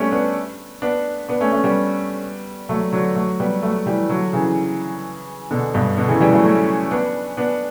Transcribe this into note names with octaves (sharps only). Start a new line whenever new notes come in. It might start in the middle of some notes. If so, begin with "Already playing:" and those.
Already playing: G3 A3 B3 C#4 D4
B3 D4
B3 D4
B3 D4
A3 C#4
A3 C#4
G3 B3
F#3 A3
D3 F#3
F#3 A3
G3 B3
F#3 A3
E3 G3
D3 F#3
C#3 E3
B2 D3
G2 B2
B2 D3
C#3 E3
E3 G3
F#3 A3
A3 C#4
B3 D4
B3 D4